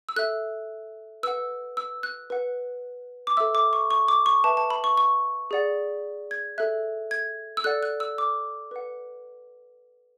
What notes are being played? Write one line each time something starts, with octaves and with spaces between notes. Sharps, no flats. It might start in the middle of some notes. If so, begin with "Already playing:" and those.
E6
A4 E5 F#6
B4 F#5 E6
E6
F#6
B4 F#5
D6
A4 E5 E6
D6
C#6
C#6
D6
C#6
B4 E5 A5
A5
B5
C#6
C#6
G#4 D5 F#5
G#6
A4 E5 F#6
G#6
E6
A4 D5 F#5 F#6
F#6
E6
D6
B4 F#5